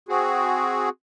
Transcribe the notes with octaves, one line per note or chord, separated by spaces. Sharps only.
C4 F#4 G#4